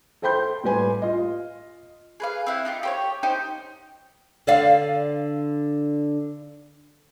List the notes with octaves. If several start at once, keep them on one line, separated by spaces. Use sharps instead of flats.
A4 C5 G5 B5 C6 G6
A2 G3 B4 G#5 C6
F4 D#5
G#4 B4 F5
C4 E4 F#5
D#4 F4 G4
G4 C5 C#5
D#4 G4 C5 D#5
D3 D5 F5